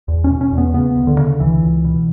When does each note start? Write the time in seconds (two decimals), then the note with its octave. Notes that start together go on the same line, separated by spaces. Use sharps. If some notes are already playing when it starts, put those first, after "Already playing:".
0.08 E2
0.24 C#4
0.30 B2
0.41 C#4
0.52 E2
0.58 B3
0.74 C#3 B3
0.96 D2
1.07 D3
1.19 C#3
1.40 C#2 E3
1.62 C#2
1.85 B2